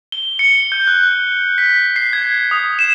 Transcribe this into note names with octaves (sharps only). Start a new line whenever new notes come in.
G7
C#7
G6
F#6
B6
C7
G#6
D#6
E7